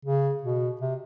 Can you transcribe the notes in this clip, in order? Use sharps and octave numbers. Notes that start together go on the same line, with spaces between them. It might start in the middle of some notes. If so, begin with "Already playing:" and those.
C#3
B2
C3